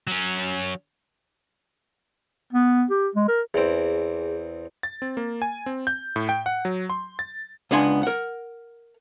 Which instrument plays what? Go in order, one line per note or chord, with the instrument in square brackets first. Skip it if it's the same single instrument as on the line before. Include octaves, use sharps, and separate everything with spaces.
[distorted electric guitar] F#3 C#4
[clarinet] B3
G4
G#3
A#4
[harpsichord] E2 C4 [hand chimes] G#4
[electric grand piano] A6
C4
A#3
G#5
C4
G6
A2
G5
F#5
F#3
C6
A6
[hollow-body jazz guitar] C#2 B3 D4 F#5 G#5 C6
A#4 F#5